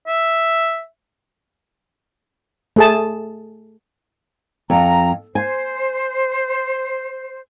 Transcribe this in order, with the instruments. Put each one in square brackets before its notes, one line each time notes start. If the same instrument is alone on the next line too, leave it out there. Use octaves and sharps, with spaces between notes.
[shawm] E5
[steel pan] A3 G#4 A5
[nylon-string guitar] F2 [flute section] A#5
[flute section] C5 [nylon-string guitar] G#5